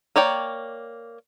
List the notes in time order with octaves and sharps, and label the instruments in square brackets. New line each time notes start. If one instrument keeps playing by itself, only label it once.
[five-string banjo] A#3 C#5 D5 G5